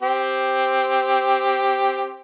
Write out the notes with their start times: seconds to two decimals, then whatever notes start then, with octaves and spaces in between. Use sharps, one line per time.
0.02 C4 G4